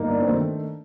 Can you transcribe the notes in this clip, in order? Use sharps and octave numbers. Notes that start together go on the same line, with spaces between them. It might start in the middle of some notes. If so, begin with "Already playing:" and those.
Already playing: G1 G2 A#3 D#4
D4
C4
D#3 A3 D4 A4